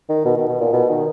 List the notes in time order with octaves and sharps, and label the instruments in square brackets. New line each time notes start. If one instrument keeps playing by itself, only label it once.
[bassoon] D#3
B2
D#3
B2
A#2
B2
D#3